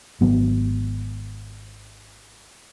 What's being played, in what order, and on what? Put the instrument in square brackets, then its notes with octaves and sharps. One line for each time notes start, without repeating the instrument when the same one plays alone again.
[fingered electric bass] G#1 F#3 B3